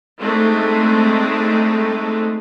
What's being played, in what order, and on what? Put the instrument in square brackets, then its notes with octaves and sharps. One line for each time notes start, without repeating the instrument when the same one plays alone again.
[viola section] G#3 A3 C4 D4 D#4